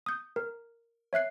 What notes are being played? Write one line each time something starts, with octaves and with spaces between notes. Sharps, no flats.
D#6 G6
A#4
C#5 E5 F#6 C7